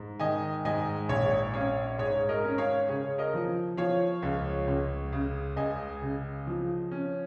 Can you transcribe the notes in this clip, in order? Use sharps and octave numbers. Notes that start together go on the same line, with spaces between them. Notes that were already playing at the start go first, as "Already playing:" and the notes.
Already playing: G#2
D#3 D#5 G#5
G#2 D#5 G#5
A#1 C#5 F5
C#4 C#5 F5
G#2 G#4 C#5
A#4 D#5
C#4
C#5 F5
C#3 G#4 C#5
A#4 D#5
F3
F3 C#5 F5
C#2
C#2
C#3
C#2 D#5 G#5
C#3
F3
C#4